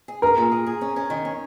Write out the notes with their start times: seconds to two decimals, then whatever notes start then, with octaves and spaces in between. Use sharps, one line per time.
0.08 G#4
0.22 G#4 A#4
0.37 A#2
0.52 G#4
0.66 G#4
0.81 C#4
0.96 C#4
1.10 D#3
1.25 C#4